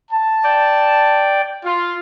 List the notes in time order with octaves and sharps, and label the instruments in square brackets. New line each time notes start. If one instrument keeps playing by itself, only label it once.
[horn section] A5
[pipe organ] D5 G5
[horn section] F4